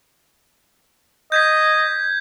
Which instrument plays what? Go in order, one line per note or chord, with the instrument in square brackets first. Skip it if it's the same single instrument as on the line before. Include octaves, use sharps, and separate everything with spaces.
[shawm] D#5 [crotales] G6 G#6 B6